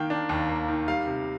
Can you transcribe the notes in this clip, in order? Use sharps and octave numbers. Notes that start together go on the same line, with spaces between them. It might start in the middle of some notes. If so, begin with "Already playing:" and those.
Already playing: D#3 A#3 G5
D4
D#2
A#3
D#3
G3 F5
C3